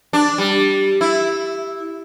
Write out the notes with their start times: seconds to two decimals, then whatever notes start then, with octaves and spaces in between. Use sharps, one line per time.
0.13 D4
0.38 G3
1.01 E4